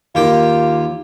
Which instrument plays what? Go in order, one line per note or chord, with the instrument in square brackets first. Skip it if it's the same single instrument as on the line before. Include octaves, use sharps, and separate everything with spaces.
[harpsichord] D#2 G4 G5 [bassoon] F4